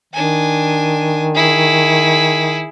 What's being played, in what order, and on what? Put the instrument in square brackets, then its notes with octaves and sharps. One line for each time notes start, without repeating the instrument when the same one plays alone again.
[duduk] D#3 [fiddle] D4 G#5
[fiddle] E4 G#4